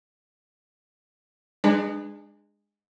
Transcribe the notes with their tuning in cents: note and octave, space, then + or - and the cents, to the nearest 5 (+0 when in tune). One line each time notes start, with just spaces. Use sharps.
G#3 -15 D4 +30 B4 +0